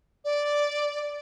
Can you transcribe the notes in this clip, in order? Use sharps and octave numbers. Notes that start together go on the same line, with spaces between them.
D5